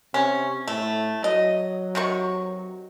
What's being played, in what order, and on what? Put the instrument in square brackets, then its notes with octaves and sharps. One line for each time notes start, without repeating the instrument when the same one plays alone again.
[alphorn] C3 [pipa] C#4
[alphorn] A2 [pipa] A3
[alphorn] F#3 [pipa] D#5
[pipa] C3 D#3 C#6